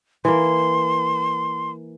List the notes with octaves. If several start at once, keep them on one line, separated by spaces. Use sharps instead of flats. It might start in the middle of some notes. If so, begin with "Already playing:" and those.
E3 A#3 C6